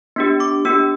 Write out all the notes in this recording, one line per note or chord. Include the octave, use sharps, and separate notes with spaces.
B3 D4 G4
D6
B3 D4 G4 E6